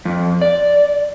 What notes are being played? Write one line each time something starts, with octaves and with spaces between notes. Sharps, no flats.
F2
D5